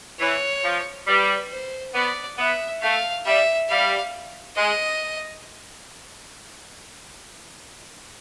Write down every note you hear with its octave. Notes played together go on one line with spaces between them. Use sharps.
E3 C#5
F3
G3 B4
C5
B3 D5
B3 E5
A3 F5
G3 E5
G3 F5
G#3 D#5